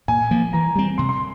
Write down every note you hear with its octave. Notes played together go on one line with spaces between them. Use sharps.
A#2 G#5
F3 A#3
E3 A#5
G3 C4
C3 C6
C6